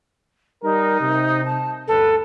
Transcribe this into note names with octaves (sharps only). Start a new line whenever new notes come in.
G3 D#4 A#4
C3
A5
D2 G2 D3 A4 B4